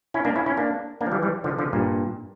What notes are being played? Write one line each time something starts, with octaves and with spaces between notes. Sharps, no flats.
C#4 E4
A#3 D4
C#4 E4
C#4 E4
A#3 D4
A#3 D4
F3
E3 G3
E3 G3
D3 F3
D3 F3
G2 A#2